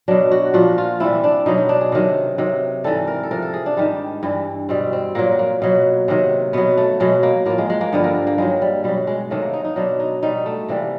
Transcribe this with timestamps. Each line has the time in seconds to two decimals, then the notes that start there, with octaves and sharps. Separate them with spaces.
0.08 B2 F#3 D4
0.32 F#4
0.54 A#2 F3 F#4
0.78 F4
1.00 C3 E3 G3 E4
1.24 D4
1.46 B2 F#3 D#4
1.58 D#4
1.69 D4
1.81 G#4
1.92 C3 D#3 F#3
2.38 C3 D#3 F#3
2.84 G#2 E3 G3 A4
3.07 A#4
3.23 A4
3.31 C3 F3 A#4
3.42 A4
3.54 G#4
3.66 D4
3.77 G#2 D#3 G3
4.23 G2 E3 G3
4.69 B2 G3 C4
4.93 C4
5.15 A#2 F#3 A#3
5.39 A#3
5.62 B2 F#3
6.08 C3 D#3 F#3
6.53 B2 F#3 B3
6.77 A3
7.00 B2 F#3 G#3
7.23 A#3
7.45 A2 F3 A#3
7.58 G#3
7.70 G#3
7.81 A#3
7.92 G2 D3 F3 B3
8.04 A#3
8.15 A#3
8.27 A#3
8.38 G2 D#3 F#3 G#3
8.62 G3
8.84 B2 F#3 G3
9.07 G#3
9.31 C3 D#3 F#3 A3
9.42 A#3
9.53 D#4
9.65 D#4
9.76 B2 F#3 D4
10.00 D#4
10.23 B2 G3 D#4
10.46 A3
10.68 C3 E3 G3 A#3